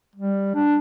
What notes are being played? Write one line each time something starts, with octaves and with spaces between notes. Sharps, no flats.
G3
D4